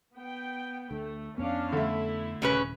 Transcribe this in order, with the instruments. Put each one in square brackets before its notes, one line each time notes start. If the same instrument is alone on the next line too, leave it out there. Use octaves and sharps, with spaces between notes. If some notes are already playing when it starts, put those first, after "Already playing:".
[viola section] B3 G5
[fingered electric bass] D2 [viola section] A3
[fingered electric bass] F2 B3 [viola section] C#4 D4 F5
[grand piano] D3 A3 [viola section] E4
[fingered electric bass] D#1 [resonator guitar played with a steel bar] C#3 C#4 B4